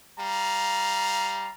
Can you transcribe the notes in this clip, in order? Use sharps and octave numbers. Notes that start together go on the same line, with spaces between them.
G3 F5 A#5